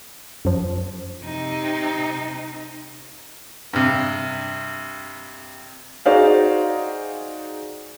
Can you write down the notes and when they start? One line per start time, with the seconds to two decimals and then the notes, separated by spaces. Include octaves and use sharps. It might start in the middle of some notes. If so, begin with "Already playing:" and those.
0.45 F#2 F3
1.24 C3 D#4
3.73 G2 C3
6.06 D#4 F#4 G#4 C5 D5 F5